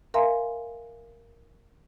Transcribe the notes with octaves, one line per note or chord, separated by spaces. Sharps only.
A#4 E5 F5 G#5 A#5 C6